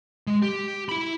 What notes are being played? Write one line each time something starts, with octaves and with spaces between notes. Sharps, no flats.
G#3
G4
E4 B5